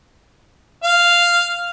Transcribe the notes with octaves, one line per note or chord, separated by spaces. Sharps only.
F5